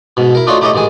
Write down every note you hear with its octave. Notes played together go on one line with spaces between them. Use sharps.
G#2 B2
E4 A#4
A3 D4 D#4 F4 F#4 C#5
A3 E4 G4 A4 C#5 D#5
A1 G#2 D#3 G#4 G#5